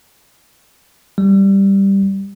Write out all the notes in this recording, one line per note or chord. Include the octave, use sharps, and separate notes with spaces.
G3